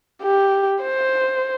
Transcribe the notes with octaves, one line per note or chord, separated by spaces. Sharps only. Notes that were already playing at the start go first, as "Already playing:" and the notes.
G4
C5